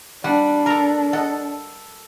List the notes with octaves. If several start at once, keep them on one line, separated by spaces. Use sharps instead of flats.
G3 D4 F#5
A4 A#4 A#5
A4 D#5 F#5